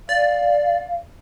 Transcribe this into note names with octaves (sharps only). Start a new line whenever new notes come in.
D5 F5